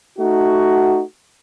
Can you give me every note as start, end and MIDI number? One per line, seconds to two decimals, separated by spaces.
0.18 1.02 57
0.18 1.02 63
0.18 1.02 66